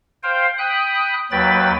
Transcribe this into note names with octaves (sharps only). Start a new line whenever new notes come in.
C5 F5 G5
G5 B5 D#6 F#6
D#2 F#3 B4 G5 B5 A6